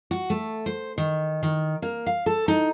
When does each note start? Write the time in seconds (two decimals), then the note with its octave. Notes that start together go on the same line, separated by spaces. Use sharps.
0.11 F#4
0.30 A3
0.66 C5
0.98 D#3
1.43 D#3
1.82 A#3
2.06 F5
2.26 A4
2.48 D#4